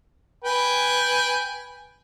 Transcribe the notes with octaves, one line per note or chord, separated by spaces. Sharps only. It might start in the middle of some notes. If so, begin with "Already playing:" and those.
B4 G5 G#5